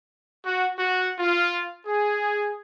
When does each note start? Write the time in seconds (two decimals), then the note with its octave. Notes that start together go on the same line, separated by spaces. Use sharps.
0.44 F#4
0.78 F#4
1.19 F4
1.87 G#4